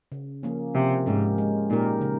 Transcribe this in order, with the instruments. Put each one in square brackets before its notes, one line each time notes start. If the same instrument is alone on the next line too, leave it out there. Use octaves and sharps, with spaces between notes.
[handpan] C#3
F3 A#3 C#4
[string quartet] C3 [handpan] F3
[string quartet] G#2 [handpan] G#3 C#4 G4 A#4
[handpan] G#3
[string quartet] A#2 [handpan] D#4 G4 A#4
[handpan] C#3